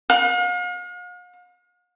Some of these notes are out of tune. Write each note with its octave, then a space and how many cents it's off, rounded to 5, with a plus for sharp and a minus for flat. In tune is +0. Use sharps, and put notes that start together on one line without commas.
F5 +45